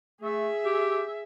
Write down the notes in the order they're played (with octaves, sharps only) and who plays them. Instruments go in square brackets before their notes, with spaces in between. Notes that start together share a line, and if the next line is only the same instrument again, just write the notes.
[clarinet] A3 [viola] G#4 E5
[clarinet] G4